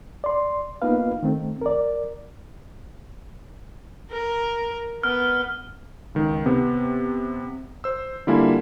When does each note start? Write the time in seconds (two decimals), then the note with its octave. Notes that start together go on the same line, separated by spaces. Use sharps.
0.24 D5 C6
0.82 A#3 B3 D#4 F4 B4 F5
1.23 D#3 A3 C4
1.61 A#4 D5
4.11 A#4
5.03 B3 F6
6.15 C#2 D#3
6.46 C3 B3
7.84 C5 E6
8.27 D3 G3 A#3 E4 F4 G#5